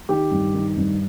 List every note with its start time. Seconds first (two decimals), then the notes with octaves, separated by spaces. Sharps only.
0.09 D#3 G4
0.31 G2
0.54 D#3
0.77 G2